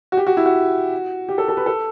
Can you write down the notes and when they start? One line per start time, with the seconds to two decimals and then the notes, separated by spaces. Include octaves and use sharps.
0.12 F#4
0.17 G4
0.27 F#4
0.37 E4
0.46 F#4
1.29 G4
1.38 A4
1.48 A4
1.57 B4
1.66 A4